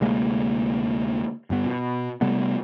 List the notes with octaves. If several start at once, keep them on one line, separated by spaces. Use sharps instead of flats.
D2 C3 G#3 A#3
G1 G2 B3
B2
C3 G3 A3 B3